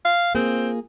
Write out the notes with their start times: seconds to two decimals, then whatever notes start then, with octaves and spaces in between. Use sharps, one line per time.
0.05 F5
0.35 A#3 C4 F4 G#4